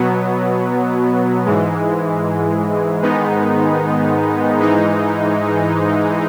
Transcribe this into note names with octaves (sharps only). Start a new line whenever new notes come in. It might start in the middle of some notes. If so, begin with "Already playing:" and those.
Already playing: B2 F#3 B3
G#2 E3 G#3
G#2 D#3 G#3 B3 D#4
G#2 E3 G#3 D#4